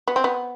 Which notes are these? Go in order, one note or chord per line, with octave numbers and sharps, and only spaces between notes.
B3
C4
B3